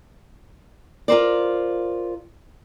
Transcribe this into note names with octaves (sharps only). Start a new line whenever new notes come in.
F4 A#4 C5 D5